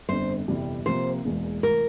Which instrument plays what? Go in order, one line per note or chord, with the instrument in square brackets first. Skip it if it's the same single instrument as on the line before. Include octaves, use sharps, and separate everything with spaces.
[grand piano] G1 F2 D3 [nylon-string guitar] C5
[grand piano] G1 F2 C3 E3 G3
[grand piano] C3 F3 A#3 [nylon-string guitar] C5
[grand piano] E1 E2 E3 A#3
[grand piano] F1 E3 A3 [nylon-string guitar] A#4